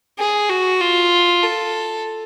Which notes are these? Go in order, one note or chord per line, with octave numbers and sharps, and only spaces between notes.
G#4
F#4
F4
A4